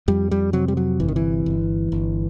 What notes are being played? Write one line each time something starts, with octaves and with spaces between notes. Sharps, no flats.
F2 G3
G3
C3 F#3
G3
F#3
G1 E3
D#3
E3
G1
G1